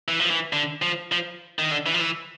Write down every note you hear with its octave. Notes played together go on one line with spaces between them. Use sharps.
E3
F3
E3
D3
F3
F3
D#3
D3
E3
F3
E3